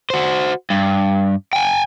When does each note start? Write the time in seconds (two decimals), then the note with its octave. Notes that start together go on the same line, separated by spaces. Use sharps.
0.10 F#4 C5
0.70 G2
1.53 G5 G#5